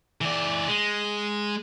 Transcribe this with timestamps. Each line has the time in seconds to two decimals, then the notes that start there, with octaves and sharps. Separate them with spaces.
0.21 E3 D5
0.67 G#3